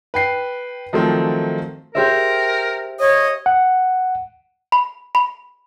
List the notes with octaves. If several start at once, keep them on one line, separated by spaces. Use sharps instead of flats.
B4 G5 C7
D#3 F3 F#3 A3 C4
G4 A#4 C5 E5
C#5 D#5
F#5
B5
B5